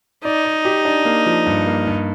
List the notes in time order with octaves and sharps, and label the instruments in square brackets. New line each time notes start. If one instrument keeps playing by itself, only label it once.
[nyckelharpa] D#4 [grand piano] D5
[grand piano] D5
G4
D4
A#3
F3
G2
A#3
G2